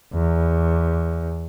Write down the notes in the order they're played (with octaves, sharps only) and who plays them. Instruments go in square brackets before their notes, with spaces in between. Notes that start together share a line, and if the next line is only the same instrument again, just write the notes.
[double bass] E2